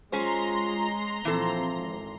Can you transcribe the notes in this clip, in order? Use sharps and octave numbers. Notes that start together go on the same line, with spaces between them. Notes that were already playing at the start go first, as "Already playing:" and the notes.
G#3 C#4 F4 G#4 C5 A#5 C6
A#1 E3 F3 C4 A4
G#1